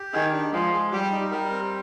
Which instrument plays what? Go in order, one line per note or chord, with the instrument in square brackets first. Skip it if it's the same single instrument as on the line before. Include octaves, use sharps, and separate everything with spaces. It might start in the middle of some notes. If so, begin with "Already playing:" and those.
Already playing: [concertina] G4
[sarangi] D#3 [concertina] G#4
[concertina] D4
[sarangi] F3 [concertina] G#3
[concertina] G#3
[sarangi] G3 [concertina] G4
[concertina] D#4
[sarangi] G3 [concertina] A#4
[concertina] C4